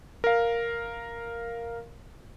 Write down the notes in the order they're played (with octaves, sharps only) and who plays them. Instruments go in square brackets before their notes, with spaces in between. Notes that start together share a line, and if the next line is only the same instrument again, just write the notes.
[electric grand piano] A#4 F5